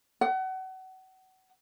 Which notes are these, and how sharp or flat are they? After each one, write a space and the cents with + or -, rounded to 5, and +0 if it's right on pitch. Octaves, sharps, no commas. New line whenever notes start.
F#5 +30